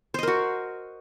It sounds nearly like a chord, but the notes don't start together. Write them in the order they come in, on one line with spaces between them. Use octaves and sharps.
C5 D#5 A#4 F#4